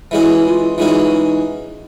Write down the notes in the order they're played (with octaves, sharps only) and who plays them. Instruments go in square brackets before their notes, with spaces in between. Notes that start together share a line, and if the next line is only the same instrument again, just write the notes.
[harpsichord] E3 G#3 C#4 F#4 [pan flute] E4
[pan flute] F4
[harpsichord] E3 G#3 C#4 F#4 [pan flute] D#4